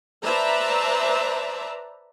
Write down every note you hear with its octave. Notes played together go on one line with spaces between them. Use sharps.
B4 C5 D5 E5 A5 A#5